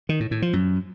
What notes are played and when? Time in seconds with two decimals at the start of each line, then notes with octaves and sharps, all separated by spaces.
0.09 D#3
0.20 A2
0.31 A2
0.42 F3
0.53 F#2